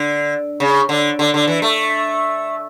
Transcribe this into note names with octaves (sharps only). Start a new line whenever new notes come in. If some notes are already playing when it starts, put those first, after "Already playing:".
Already playing: D3
C#3
D3
D3
D3
E3
A3